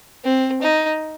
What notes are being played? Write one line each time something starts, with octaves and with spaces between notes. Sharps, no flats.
C4
D#4